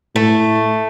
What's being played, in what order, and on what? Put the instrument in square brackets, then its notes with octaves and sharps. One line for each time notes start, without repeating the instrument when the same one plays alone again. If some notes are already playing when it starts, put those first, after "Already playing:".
[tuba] A2 [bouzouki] A3